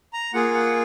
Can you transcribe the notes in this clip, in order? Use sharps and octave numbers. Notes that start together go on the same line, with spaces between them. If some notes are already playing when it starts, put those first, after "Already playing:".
A#5
A#3 F4 G#4 F#5
F#5